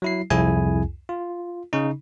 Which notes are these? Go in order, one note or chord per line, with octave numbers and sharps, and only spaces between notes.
F#3 E4 C7
C2 F2 E4 G#4 G#5
F4
C#3 D#4